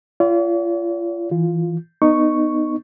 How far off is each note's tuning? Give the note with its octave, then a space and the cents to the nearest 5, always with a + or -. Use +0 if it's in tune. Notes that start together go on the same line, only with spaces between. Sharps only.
F4 -35 D5 -45 F#5 +10
E3 +0 F4 +0
B3 +5 D#4 -15 C#6 +0